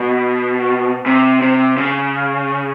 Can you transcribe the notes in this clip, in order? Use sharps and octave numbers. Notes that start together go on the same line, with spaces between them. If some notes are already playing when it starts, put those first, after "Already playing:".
Already playing: B2
C3
C3
C#3